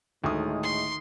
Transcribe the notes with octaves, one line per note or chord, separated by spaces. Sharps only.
D2 A2 D#3 G#3 D#6
C6